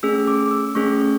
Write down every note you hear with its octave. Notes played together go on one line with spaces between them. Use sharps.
A3 C#4 G#4 E6
D6
E6
A3 C#4 G#4 C#6